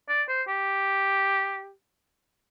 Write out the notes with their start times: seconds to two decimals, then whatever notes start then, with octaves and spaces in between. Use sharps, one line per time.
0.09 D5
0.29 C5
0.48 G4